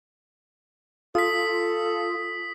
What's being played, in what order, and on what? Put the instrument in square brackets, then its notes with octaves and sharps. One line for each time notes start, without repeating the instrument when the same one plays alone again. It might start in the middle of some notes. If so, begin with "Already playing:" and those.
[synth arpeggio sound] F4 [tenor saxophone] A4 [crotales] D#6 B6